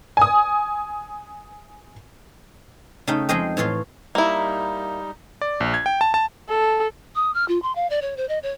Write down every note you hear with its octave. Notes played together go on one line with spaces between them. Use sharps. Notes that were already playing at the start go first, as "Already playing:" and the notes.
G#5 D#6
C#3 A3 D#4 G5
F2 G#3 C5 D#5 G5
A2 E3 F4 C#5 C6
G3 A#3 D#4 E4
D5
A#1
G#6
G5
A5
A5
A4
D#6
F6
F4
C6
F5
D5
C#5
C5
D#5
C#5